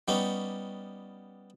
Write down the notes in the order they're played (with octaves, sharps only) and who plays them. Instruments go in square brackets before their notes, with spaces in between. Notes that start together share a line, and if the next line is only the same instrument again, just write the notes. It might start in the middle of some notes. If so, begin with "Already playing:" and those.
[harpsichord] G3 B3 C#4 D#4